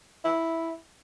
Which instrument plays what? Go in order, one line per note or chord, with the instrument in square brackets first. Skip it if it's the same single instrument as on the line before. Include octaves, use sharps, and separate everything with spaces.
[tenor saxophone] E4